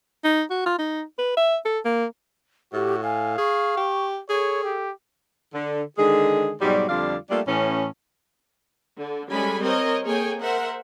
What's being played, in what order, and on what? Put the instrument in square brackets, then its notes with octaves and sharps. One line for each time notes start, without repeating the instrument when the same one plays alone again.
[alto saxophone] D#4
F#4
F4
D#4
B4
E5
A4
A#3
[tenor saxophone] A2 [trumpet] F#4 [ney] G4
[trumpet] F5 [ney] G#5
[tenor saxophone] G#4 [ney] C#6
[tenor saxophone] G4
[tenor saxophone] G#4 [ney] A4 [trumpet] C#5
[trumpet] G4
[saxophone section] D3
D3 D#3 G#3 G#4
G#2 B2 F#3 G3
F2 D3 G3 F4 D5 F5
G3 A3 A#3 D4 F4 A4
A2 E3 C#4
[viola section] D3
G3 G#3 C#4 A4 G#5 B5
C4 A#4 C5 C#5 D#5
A#3 G#4 A4 C#5 G5 G#5
A#4 C5 E5 F#5